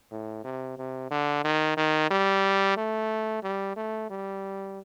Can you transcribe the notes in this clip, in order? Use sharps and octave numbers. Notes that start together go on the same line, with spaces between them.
A2
C3
C3
D3
D#3
D#3
G3
A3
G3
A3
G3